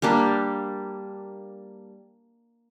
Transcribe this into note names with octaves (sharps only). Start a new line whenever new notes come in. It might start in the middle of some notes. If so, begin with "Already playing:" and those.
G3 A#3 D4 G4